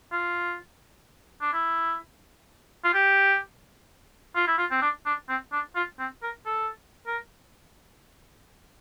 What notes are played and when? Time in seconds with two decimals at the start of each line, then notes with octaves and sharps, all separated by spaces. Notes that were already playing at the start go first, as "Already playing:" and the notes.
0.12 F4
1.41 D4
1.53 E4
2.84 F4
2.94 G4
4.35 F4
4.47 E4
4.58 F4
4.71 C4
4.82 D4
5.06 D4
5.29 C4
5.52 D4
5.76 F4
5.99 C4
6.23 A#4
6.46 A4
7.07 A#4